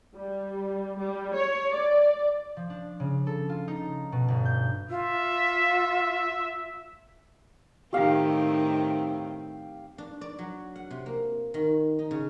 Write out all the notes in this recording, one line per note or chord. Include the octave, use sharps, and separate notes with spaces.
G3
G3
C#5
D5
F3
D4
C#3
A4
F4
D#4
B2
G1
G6
F4 E5
A2 D#3 C4 G4 F5
D4
D5
F#3
F#5
C3
A#3
D#3
D#4
C#3